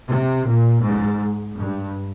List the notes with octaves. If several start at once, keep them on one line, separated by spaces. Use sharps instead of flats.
C3
A#2
G#2
G2